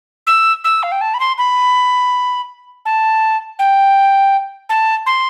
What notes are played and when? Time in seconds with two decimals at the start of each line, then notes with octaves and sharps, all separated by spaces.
0.27 E6
0.64 E6
0.83 F5
0.92 G5
1.01 A5
1.14 B5
1.20 C6
1.38 B5
2.85 A5
3.59 G5
4.69 A5
5.06 C6